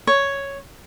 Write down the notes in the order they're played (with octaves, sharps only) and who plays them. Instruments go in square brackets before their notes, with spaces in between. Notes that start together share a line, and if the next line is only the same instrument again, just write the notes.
[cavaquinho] C#5